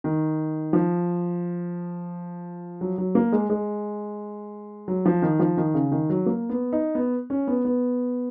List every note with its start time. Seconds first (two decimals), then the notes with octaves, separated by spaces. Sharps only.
0.04 D#3
0.73 F3
2.81 F#3
2.98 F#3
3.15 A#3
3.32 G#3
3.50 G#3
4.88 F#3
5.06 F3
5.22 D#3
5.40 F3
5.57 D#3
5.74 C#3
5.92 D#3
6.10 F#3
6.26 A#3
6.50 B3
6.73 D#4
6.95 B3
7.30 C#4
7.47 B3
7.65 B3